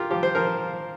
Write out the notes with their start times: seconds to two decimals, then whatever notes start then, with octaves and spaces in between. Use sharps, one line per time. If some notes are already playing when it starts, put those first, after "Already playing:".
Already playing: F4 G4 A#4
0.11 F3 G4
0.23 C5
0.35 F3 A#4